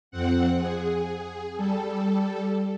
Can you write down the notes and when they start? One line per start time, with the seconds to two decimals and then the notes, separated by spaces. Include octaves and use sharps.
0.11 F2 C4 F#5
0.58 G#4
1.56 G3 A4